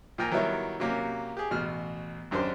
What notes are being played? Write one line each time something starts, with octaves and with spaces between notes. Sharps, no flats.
A#2 F3 G5 G#5 A#5
D#3 F#3 G3 B3 E4 C#5
C3 F#3 A#3 C#4 G4
G4 G#4
A1 B2 F6
G#1 F#2 D4 G4 C5